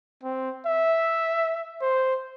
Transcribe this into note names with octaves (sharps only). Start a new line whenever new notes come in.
C4
E5
C5